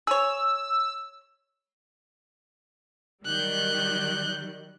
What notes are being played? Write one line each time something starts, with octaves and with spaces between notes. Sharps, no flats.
G#4 C#5 E6
D#3 F#3 G3 F#6 G6